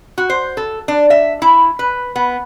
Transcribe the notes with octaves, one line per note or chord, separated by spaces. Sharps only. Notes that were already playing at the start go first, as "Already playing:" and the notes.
F#4
C5
A4
D4
E5
E4
B4
B3